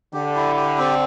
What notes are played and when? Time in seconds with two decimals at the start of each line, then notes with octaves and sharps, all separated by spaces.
0.13 D3 G4
0.36 E4
0.56 G4
0.78 C4